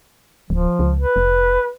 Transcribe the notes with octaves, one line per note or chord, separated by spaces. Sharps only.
D1 F3
C#2
B4
F1